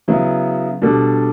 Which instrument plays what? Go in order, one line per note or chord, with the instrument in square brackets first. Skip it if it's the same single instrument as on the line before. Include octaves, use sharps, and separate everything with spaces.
[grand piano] C#3 F#3 B3 E4
B2 G3 D4 A4